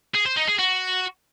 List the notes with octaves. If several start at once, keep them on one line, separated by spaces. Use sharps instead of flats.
G#4
C5
D#4
G#4
F#4